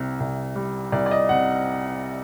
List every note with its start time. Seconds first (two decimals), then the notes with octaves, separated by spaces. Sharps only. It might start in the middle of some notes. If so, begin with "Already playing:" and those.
Already playing: C2 C3
0.20 C2
0.56 G3
0.92 C2 D5
1.06 D5
1.11 D#5
1.29 C3 F#5